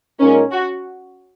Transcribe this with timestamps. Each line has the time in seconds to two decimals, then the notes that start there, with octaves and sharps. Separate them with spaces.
0.19 A#2 G#3 C#4 D#4 A#4
0.51 F#4